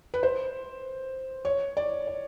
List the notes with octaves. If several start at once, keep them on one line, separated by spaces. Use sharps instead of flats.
B4
C5
C#5
D5
D5